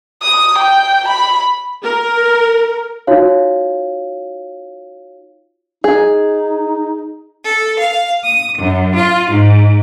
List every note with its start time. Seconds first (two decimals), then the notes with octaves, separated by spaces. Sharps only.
0.22 D#6
0.58 G5
1.08 B5
1.83 A#4
3.07 D#4 F4 F#4 C#5 F5
5.84 D#4 G#4
7.44 A4
7.79 F5
8.23 D#6
8.58 F#2
8.95 F4
9.31 G#2